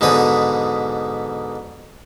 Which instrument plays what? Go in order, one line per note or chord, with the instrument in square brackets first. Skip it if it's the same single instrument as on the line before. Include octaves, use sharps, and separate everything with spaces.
[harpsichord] G#2 B2 D3 B4 D#6